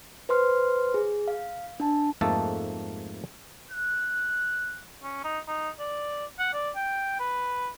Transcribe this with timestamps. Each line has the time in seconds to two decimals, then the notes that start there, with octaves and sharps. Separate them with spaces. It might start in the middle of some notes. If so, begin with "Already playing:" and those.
0.29 B4 C5 C6 F6
0.94 G#4
1.28 F5
1.80 D4 A5
2.21 F2 G#2 A3 A#3 A4 A5
3.71 F#6
5.03 C#4
5.24 D#4
5.48 D#4
5.79 D5
6.39 F#5
6.53 D5
6.76 G5
7.20 B4